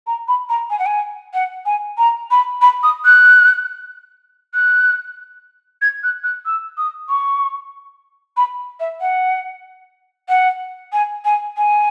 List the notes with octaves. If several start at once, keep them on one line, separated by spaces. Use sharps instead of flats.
A#5
B5
A#5
G#5
F#5
G#5
F#5
G#5
A#5
B5
B5
D#6
F#6
F#6
G#6
F#6
F#6
E6
D#6
C#6
B5
E5
F#5
F#5
G#5
G#5
G#5